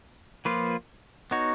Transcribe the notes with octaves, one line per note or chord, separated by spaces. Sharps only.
F3 A#3 F4 B4
B3 D#4 F#4 C#5